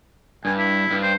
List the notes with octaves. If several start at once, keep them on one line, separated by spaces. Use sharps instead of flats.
G2 G#5
E4
G2
C5